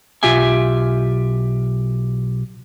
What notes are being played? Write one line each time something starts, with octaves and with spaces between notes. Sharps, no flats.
B1 F4 G4 E5 G#5